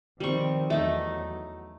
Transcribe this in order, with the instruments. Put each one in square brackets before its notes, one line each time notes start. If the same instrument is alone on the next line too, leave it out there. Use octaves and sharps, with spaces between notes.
[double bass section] D#3 F3 C4 [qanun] G3 C#6
[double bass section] E2 F#3 [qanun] A3 D#4